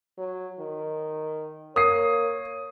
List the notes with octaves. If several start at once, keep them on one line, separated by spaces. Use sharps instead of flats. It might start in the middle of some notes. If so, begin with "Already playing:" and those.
F#3
D#3
A#3 C#5 D#6 C7